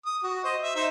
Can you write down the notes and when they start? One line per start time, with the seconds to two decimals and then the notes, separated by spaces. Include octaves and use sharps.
0.06 D#6
0.23 F#4
0.44 C5 D#5
0.62 E5
0.75 D#4 C5 E5